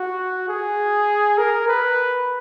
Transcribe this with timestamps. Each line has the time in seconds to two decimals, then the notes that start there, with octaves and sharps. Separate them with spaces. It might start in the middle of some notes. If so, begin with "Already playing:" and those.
Already playing: F#4
0.48 G#4
1.38 A#4
1.68 B4